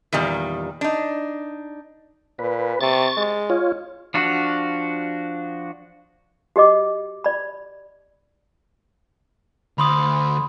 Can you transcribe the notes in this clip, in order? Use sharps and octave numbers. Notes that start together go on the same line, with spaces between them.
E2 A#2 D#3 G3
D4 D#4
A#2 B4
C3 C#6 A6
G#3
F4 C#5
F3 D4 F#4
F#4 G4 D#5 D6
D5 B5
D2 B5 C6 D#6